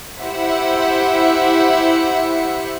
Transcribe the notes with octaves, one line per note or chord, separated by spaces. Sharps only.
E4 G4 C5 E5 F#5